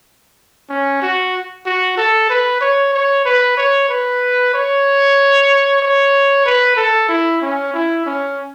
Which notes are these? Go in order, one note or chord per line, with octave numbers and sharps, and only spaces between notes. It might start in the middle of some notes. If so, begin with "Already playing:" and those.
C#4
F#4
F#4
A4
B4
C#5
C#5
B4
C#5
B4
C#5
C#5
B4
A4
E4
C#4
E4
C#4